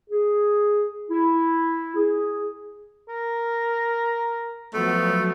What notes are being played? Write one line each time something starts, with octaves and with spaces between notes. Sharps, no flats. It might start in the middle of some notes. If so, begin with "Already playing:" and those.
G#4
E4
G#4
A#4
F3 F#3 A3 B3